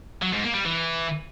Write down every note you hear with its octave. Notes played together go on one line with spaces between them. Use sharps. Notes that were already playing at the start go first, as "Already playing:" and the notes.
F#3
G#2
A#3
G3
E3